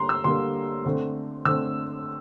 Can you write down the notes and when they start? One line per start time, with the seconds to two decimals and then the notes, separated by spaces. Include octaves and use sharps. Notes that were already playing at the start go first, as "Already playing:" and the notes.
Already playing: D3 G3 A#3 A#5 C6
0.09 E6
0.24 D3 G3 A#3 C6
0.85 D3 A3 C4
1.45 D3 A3 C4 E6